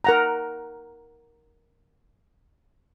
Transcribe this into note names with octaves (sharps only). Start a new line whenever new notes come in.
A#4 F#5 A#5